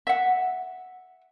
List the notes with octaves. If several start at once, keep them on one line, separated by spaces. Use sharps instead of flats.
E5 F#5